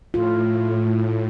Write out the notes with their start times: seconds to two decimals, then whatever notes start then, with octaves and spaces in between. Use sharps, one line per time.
0.14 A2 F4